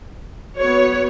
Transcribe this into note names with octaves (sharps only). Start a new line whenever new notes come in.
F#3 B3 C#5